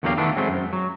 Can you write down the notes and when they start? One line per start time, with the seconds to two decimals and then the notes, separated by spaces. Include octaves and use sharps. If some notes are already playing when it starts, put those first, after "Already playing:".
0.03 E2 D3 F#3 A#3 G4 F5
0.17 D#3 E3 A3 B3 D4 E4
0.36 F#3 G#3 A3 C4
0.49 F#2
0.73 F#3